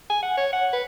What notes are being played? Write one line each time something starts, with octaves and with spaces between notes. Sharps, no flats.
G#5
F#5
C#5
F#5
B4